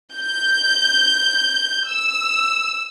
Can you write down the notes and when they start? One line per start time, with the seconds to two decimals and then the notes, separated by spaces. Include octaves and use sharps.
0.15 G6
1.89 E6